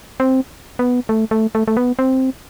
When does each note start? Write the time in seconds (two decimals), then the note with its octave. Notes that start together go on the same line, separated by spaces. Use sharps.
0.20 C4
0.79 B3
1.09 A3
1.31 A3
1.55 A3
1.68 A3
1.77 B3
1.99 C4